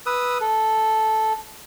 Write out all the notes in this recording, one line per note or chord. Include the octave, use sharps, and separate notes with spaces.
B4 D#6 E6
A4